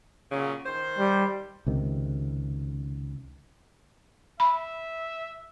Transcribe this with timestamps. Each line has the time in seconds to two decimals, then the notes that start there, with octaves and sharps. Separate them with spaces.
0.32 A#2 C#3 F#3
0.66 D#3 C5
0.99 G3
1.66 C#2 C3 D#3
4.40 E5 B5